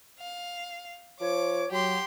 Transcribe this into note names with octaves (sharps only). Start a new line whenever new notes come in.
F5
F3 C#5 D6
F#3 G4 C6